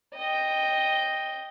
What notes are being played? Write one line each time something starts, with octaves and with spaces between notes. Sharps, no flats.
D#5 G5